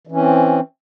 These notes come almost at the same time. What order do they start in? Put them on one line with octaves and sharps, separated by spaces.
E3 C#4 C4